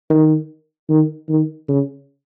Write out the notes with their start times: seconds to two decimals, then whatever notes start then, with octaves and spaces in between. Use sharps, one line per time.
0.10 D#3
0.89 D#3
1.29 D#3
1.68 C#3